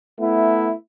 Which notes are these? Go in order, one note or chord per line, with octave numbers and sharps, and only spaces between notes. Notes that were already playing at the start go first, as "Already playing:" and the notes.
A3 B3 E4